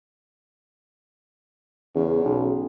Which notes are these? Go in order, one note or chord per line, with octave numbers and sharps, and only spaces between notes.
E2 C#3
B1